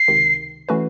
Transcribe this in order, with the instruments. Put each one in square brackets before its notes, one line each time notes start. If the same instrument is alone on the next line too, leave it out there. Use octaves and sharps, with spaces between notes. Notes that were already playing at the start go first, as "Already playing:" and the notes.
Already playing: [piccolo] C7
[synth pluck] C#2 C3 D#3
E3 A3 C#4 F#4 B4